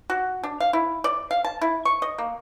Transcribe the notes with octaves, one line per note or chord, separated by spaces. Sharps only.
F#4
D4
F5
E4
D5
F5
A5
E4
C#6
D#5
A#3